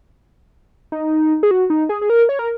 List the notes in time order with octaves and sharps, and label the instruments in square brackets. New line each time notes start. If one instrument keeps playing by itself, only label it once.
[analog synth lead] D#4
G#4
F#4
D#4
G#4
G#4
A#4
C#5
A#4